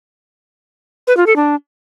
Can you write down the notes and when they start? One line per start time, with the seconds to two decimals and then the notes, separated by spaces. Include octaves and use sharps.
1.07 B4
1.17 F4
1.26 A4
1.36 D4